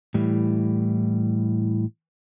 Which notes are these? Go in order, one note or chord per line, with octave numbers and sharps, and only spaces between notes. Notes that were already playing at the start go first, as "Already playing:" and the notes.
A2 E3 G3